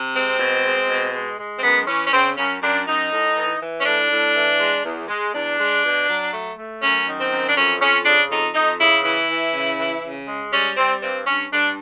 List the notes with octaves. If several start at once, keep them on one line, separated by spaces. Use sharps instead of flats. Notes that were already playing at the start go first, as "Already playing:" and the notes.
Already playing: C3
G#3 C4
B2
G#3
B2
G#3
G#3
C4
F#2 B3
E3 C#4
C#4
C#3 C4
F#2 C#4
F#2 D4
F#2 D#4
A2
E3
E3
C#4
A2 D4
A2
E3
G#3
E2
G#3
E2 D4
G#3
B2
F#3
A3
A3
F#2 C#4
D#3
C4
F#2
D4
F2 C#4
F2 C#4
C#3 D4
F2 D#4
F2 D#4
C#3 E4
E3 E4
E3
C#3
E3
C#3
G#3
G3 C#4
G3 C4
G2 C4
G2 C#4
G2 D4